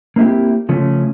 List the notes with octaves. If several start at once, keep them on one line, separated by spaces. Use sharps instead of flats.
A#3 C4 D#4 E4 G4
C#3 F3 A3 C#4